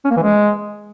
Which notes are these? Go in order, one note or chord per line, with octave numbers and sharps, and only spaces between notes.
C#4
A#3
E3
G#3